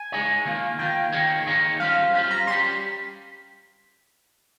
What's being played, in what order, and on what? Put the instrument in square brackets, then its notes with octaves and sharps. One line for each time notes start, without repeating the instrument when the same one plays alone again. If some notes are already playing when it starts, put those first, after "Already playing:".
Already playing: [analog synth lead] G#5
[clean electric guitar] G#3 D#4 G#4 C#5
D#3 A#3 F4
[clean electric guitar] D#3 A#3 F4 [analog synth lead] G5
[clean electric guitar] D#3 A#3 D#4 G#4 C#5
D#3 A#3 D#4 G#4 C#5
[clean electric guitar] G3 C#4 F4 C5 [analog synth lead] F5
[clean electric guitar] G3 C#4 F4 C5 [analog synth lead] F5
[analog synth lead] A#5
[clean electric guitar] G3 C#4 G4 [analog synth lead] C6